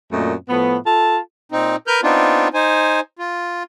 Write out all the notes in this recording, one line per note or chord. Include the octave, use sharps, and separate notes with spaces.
F#2 A#2 A3 C4 D#5
A2 F3 B3
F4 A4 A5
A#2 C4 D#4
A#4 B4 F6 G6
B3 C4 D4 D#4 F4
D#4 C5 G#5
F4